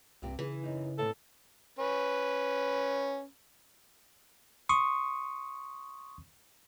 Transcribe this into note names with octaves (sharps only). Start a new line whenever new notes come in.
C2 G2 C3 G4
C#3 E3 G#4
F#2 D#4
A2 C3 B3 A4
C#4 B4
C6 C#6 D#6